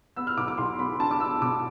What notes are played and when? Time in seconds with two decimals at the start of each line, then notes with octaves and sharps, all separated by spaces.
0.16 B3 E6
0.27 F6
0.37 B1 D6
0.48 D6
0.58 B1 C6
0.79 B3 B5
1.00 D4 A5
1.11 D6
1.20 B3 E6
1.42 B2 D6